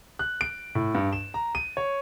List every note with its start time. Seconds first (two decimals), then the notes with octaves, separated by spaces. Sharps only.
0.19 F#6
0.41 D7
0.75 A2
0.95 G2
1.13 E7
1.34 A#5
1.55 D#7
1.77 C#5